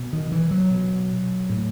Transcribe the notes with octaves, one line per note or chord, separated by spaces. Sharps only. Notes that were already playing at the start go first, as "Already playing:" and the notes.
Already playing: B2
D#3
E3
F#3
B2
A2